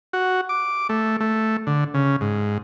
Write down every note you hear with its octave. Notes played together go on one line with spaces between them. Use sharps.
F#4
D6
A3
A3
D3
C#3
G#2